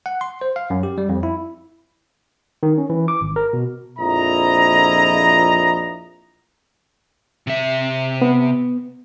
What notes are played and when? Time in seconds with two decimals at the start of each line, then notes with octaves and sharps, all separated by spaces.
0.06 F#5
0.21 C6
0.41 C5
0.56 F5
0.70 F#2
0.83 G4
0.98 G3
1.09 F2
1.23 E4
2.63 D#3
2.78 C#4
2.90 E3
3.08 D6
3.21 G#1
3.36 A#4
3.53 B2
3.98 A#1 F2 E4 D#5 A#5
7.47 C3 E5
8.22 B3